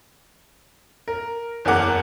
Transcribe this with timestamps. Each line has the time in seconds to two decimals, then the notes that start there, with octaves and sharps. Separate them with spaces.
1.08 A#4
1.65 F#1 E2 C#4 A#4 F#5 D6